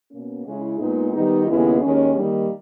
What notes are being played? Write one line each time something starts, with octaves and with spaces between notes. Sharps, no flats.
B2 A#3 C#4
C#3 G#3 C#4 E4
A#2 G#3 B3 D#4
D#3 G3 B3 D#4
D#2 C#3 G#3 B3 E4
D#2 D#3 G#3 C#4
D#3 G3 A#3 D#4